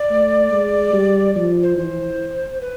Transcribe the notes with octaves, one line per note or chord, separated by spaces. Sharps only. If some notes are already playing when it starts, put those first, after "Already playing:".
Already playing: D5
A3
G#3
G3
F3 D5
C5
E3 C5
B4